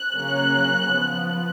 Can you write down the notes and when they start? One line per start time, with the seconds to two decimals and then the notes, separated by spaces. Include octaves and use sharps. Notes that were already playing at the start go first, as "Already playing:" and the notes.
Already playing: F#6
0.13 C#3 F#3 A#3 C#4
0.91 F3 B3